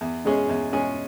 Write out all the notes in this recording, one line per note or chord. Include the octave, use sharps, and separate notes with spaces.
E2
B2 G#3 C#4 G#4
E2
B2 G#3 C#4 G#4